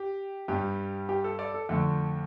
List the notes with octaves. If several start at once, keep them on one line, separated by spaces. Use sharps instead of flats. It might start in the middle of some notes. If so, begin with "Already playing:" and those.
Already playing: G4
G2 G3 G4
G4
A4
A4 D5
A4
F2 D3 A3 A4